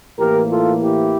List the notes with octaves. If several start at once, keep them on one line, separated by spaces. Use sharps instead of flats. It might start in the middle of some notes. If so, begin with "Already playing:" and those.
A2 E3 A#3 G4 A#4
F4 A4
E4 G4